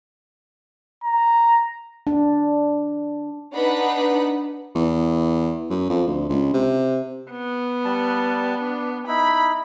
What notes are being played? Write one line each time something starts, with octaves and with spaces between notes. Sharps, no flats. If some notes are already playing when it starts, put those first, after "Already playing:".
A#5
D4
B3 D4 D#4 B4 F#5 B5
E2
F#2
F2
D2
C#2
C3
B3
G3 A5
D4
D#4 E4 B5